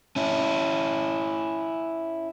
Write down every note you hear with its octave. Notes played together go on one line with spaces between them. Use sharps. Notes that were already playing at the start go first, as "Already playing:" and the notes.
C#4 E4